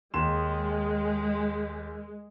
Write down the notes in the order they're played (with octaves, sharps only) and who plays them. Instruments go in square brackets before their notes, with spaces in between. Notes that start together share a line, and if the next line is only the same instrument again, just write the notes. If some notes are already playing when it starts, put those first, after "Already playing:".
[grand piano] D#2 C6 E7 [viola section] G#3